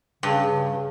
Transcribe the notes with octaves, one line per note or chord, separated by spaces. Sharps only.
G2 C#3
C#3